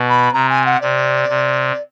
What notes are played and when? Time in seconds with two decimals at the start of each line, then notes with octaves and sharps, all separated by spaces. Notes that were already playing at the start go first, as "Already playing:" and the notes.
Already playing: B2
0.09 B5
0.33 C3 A#5
0.49 G#5
0.66 F#5
0.81 C3 D5
1.29 C3